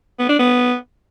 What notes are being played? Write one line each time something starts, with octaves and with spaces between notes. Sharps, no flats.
B3
D4
B3